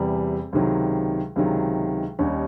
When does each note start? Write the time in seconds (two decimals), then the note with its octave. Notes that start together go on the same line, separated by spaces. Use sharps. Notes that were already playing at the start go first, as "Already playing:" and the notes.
Already playing: E2 C3 E3 G3 C4
0.53 C#2 C3 D#3 F#3
1.36 C#2 C3 D#3 F#3
2.19 D#2 D#3 G3 C#4 D#4